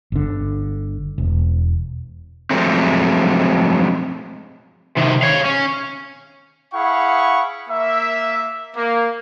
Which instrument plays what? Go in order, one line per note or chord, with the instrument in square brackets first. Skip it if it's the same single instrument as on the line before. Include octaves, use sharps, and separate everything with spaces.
[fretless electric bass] G1 D3
E1
[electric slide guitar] F3 F#3 G#3 A3 C4
[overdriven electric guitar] C3 D#3
C#5 F5
C#4
[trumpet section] E4 G#4 F5 F#5 B5 C#6
A#3 E5
A#3